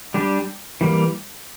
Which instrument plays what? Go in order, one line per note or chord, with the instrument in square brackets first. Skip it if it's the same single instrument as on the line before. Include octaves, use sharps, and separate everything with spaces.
[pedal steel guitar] G3 D4 G4
E3 G3 A#3